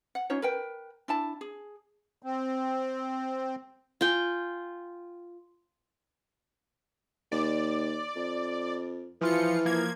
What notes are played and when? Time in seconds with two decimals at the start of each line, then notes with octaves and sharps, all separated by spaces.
0.15 F#5
0.30 C#4 D#4 F4 C#5
0.42 A#4 B4 G5
1.08 D4 E4 A5
1.41 G#4
2.23 C4
4.01 F4 G5 G#5
7.32 D#2 D5
8.16 F2
9.21 E3 F3 F4 C#7
9.65 F3 A#3 G#6